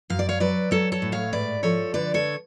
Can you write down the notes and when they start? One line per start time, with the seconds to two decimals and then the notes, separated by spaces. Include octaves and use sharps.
0.10 F#2 F5
0.19 D5
0.29 C#5 F5
0.40 F#3 B4 D5
0.71 F#3 A4 C#5
0.92 A4 C#5
1.02 A2
1.12 C#5 F5
1.32 G#2 B4 D5
1.63 F3 A4 C#5
1.94 D3 B4 D5
2.14 A4 C#5